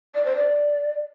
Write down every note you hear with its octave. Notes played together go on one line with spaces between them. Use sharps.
D5
C5
D5